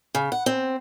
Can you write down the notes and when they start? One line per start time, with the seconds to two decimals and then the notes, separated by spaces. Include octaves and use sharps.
0.15 C#3
0.32 F#5
0.46 C4